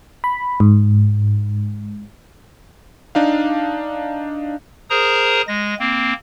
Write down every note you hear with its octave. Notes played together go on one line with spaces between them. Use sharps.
B5
G#2
D4 D#4 F5
G#4 A#4 C5 A#5 D#6
G#3 A#6
A#3 C4